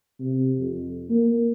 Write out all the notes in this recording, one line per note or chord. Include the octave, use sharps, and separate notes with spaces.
C3
F2
A#3